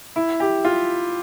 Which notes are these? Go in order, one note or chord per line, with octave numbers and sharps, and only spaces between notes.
E4
G4
F4